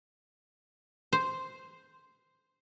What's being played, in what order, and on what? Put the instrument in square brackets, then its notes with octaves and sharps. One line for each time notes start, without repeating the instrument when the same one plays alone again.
[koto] C5